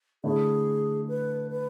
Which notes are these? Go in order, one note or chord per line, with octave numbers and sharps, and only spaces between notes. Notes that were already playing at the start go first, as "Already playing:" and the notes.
D3 A3 E4 G#4
B4
B4